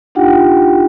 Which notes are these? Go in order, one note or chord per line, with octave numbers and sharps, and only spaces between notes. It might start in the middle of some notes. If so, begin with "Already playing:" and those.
D4 D#4 F4 G4 F#5 G5